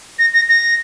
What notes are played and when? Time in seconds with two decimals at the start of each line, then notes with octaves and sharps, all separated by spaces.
0.19 A#6
0.34 A#6
0.49 A#6